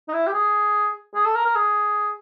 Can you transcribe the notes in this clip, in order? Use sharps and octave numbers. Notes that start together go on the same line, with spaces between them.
D#4
E4
G4
G#4
G#4
A4
A#4
A#4
G#4